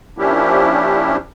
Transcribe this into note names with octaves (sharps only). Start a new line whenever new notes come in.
F3 A#3 C#4 D4 E4 G4